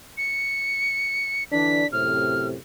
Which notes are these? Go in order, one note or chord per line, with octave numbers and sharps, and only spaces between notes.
C#7
D3 E3 D4 B6
F#2 A2 C3 F6